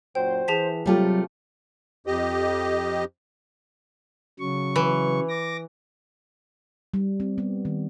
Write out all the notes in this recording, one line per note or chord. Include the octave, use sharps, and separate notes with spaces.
F#2 A#2 F#3 C5 G5
E3 G#4 A5 B6
C3 F#3 G3 A3 F4 G4
F2 G4 D#5
C#3 F#3 C#6
E3
D6 A#6
G3
C4
B3
D#3